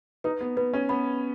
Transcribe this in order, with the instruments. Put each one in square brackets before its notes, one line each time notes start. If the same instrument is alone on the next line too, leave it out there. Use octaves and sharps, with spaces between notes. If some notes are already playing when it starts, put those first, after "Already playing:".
[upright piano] D#4 [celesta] B4
[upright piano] B3
[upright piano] B3 [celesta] B4
[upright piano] C#4
[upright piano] B3 [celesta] B5